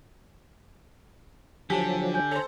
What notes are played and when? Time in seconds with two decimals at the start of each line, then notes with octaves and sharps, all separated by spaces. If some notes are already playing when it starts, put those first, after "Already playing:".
1.70 D3 F3 F#3 G4 G#5 A5 B6
2.14 G#5 G6
2.31 A4 C5 C#5 A#5 B5